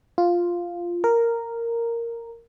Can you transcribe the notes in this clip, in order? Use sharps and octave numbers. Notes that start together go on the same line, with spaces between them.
F4
A#4